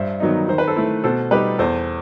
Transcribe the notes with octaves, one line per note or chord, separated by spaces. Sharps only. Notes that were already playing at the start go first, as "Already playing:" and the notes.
Already playing: G2 C5 E5
D#3 F#3 B3 D#4
D#3 C5
B4
A4 C5
A3 E4
B2 A4 C5
G3 D#4 G4 B4
E2 A4 C5